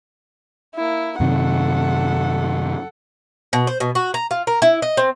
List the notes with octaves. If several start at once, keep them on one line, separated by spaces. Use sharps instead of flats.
A#3 E4
F#2 C3 D#3 A4 F#5
B2
C5
B2
F#4
A#5
F4
A#4
E4
D#5
C4